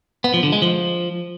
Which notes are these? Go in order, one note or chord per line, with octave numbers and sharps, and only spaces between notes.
B3
F3
D3
G#3
F3